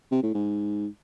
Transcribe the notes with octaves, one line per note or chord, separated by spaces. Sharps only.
C3
A2
G#2